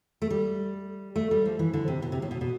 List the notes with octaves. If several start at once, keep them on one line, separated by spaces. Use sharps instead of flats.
A3
G3
A3
G3
F3
E3
D3
C3
B2
C3
A2
B2
B2